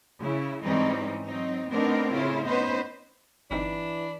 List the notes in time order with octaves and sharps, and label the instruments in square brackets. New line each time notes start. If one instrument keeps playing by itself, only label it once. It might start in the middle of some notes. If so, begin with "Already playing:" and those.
[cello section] C#3 E4
G#2 E3 G3 C4 C#4 D#4
F#3 C4 D#4
A3 B3 C4 D4 D#4 A#4
A2 C#3 E4 F4
B3 C#4 D#4 B4 C5
[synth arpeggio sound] G1 C4 D#4 [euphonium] E3 [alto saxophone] D4 [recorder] B5